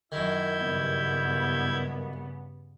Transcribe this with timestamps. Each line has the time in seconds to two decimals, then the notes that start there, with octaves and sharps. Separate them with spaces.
0.12 F#2 D#3 E4 G6 G#6
0.60 G2 C#3 B3